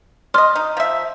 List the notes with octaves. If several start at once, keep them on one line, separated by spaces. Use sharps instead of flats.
D5 D#5 C6 F6
D#4
F3 E5